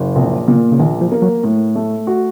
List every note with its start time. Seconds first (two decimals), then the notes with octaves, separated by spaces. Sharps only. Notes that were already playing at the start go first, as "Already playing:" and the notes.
Already playing: F#1
0.16 A#1 C3
0.48 A#2 C#3
0.72 C#3
0.79 A#1 D#3
1.01 F3
1.12 A#3
1.22 F#3
1.44 A2
1.75 A3
2.07 F#4